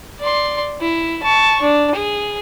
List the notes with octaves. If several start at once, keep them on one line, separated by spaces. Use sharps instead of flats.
D5 C6
E4
A5 C#6
D4
G#4